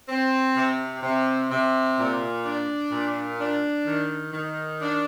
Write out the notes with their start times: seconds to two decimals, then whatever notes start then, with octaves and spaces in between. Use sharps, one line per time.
0.09 C4
0.56 C3
1.03 C3
1.50 C3
1.98 A#2
2.45 D4
2.91 A#2
3.39 D4
3.86 D#3
4.33 D#3
4.81 D4